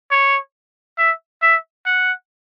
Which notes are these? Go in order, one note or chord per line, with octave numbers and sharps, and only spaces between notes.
C#5
E5
E5
F#5